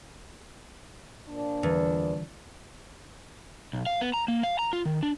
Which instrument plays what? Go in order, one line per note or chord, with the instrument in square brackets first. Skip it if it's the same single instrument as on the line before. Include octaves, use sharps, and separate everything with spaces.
[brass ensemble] A#2 F3 D4
[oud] E2 [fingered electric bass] D3 E3 G3
[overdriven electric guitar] B1
F5
B3
A#5
A#3
F5
A#5
F4
D#3
D4